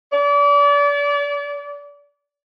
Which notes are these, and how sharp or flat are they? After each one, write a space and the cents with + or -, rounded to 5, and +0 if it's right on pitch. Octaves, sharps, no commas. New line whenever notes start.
D5 -35